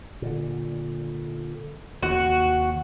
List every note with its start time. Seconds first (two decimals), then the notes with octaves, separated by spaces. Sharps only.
0.22 A#2 D3
2.03 D#2 C3 F#4